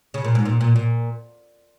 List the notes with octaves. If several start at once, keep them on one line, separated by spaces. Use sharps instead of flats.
C#3
A#2
G#2
A#2
A#2
A#2